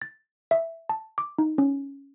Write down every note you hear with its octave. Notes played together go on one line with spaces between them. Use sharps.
A6
E5
A5
D6
D#4
C#4